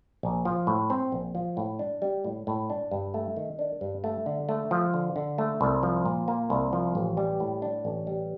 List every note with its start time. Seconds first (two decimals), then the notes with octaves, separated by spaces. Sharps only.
0.23 A#1
0.45 F3
0.67 A2
0.90 C4
1.12 A#1
1.35 F3
1.57 A2
1.79 D4
2.02 G3
2.24 A2
2.47 A2
2.70 D4
2.91 G2
3.14 A3
3.36 D#3
3.59 D4
3.81 G2
4.04 A3
4.26 D3
4.49 A3
4.71 F3
4.94 D3
5.16 D3
5.38 A3
5.61 C2
5.83 F3
6.05 A#2
6.28 A#3
6.50 C2
6.73 F3
6.95 A1
7.17 G3
7.40 A2
7.62 D4
7.85 A1
8.07 G3